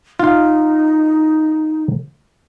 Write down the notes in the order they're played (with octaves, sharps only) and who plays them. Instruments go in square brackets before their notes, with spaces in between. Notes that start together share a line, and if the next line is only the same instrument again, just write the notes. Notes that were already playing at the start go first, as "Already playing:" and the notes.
[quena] D#4 [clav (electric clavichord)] F4 F5